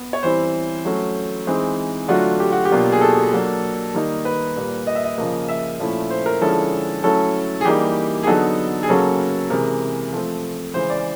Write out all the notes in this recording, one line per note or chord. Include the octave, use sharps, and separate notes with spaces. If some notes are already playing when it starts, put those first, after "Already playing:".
Already playing: B3
C#5
E3 G3 C4 E4 C5
F#3 A3 C#4
E3 G#3 C4 D#4
D3 F#3 A3 D4 F4 F#4
G4
F#4
G4
B2 F#3 A#3 D4 F4
G#4
A4
F#3 A#3 D4
D#3 G3 A#3 D#4
B4
A#2 G3 A#3
D#5
E5
D#5
C#3 F3 A#3
E5
A#2 F3 A3 C#4 E4
C5
A#4
D3 F3 G#3 C#4 E4 A4
F#3 A3 C#4 E4 A4
G#4
E3 G3 A#3 D#4 G4
G#4
D3 F#3 B3 D#4 A4
G#4
C#3 F#3 A#3 C#4 A4
C3 E3 G#3 A#4
F3 A3 C4
C#3 E3 G#3 C5
D5